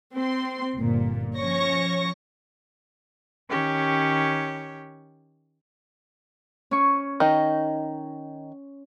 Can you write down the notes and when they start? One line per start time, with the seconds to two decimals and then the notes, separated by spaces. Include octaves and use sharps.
0.15 C4 C6
0.76 G1 A#2
1.38 F3 C#4 C#5 C#6 A#6
3.49 D#3 C#4 G4 C#5
6.71 C#4 C#6
7.20 D#3 D#4